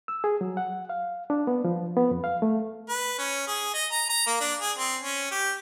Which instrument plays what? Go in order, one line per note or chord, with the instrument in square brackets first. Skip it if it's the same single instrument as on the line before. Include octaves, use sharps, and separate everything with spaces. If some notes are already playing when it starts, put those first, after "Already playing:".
[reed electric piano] E6
G#4
F#3
F#5
F5
D4
B3
F3
B3
F2
F5
A3
[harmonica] B4
C#4
G#4
D#5
A#5
A#5
A#3
D4
G#4
C4
C#4
G4